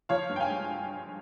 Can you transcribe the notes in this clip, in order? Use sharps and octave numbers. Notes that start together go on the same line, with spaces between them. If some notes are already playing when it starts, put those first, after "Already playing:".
F3 C#5 F5
G2
G5
F5 G#5
G#3